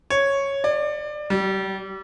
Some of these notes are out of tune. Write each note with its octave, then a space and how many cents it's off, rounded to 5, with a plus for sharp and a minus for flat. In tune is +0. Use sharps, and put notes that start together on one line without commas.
C#5 -5
D5 +25
G3 -30